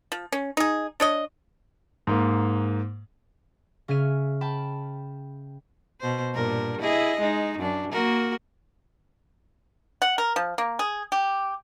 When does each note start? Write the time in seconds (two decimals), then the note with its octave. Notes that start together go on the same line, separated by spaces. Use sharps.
0.12 F3
0.32 C#4
0.57 D#4 G#4
1.00 D4 C#5 D#5
2.07 G#2 A#3
3.88 C#3 C#4 E5 F6 D#7
4.41 G5 A5 B5
6.00 B2 C5
6.34 G2 A#2 A#4
6.81 E4 G#4 D#5
7.20 G#3 D#4
7.59 F#2 D4
7.92 A#3 F#4 A#4
10.02 F#5
10.18 A#4
10.36 F3
10.58 A#3
10.79 G#4
11.12 G4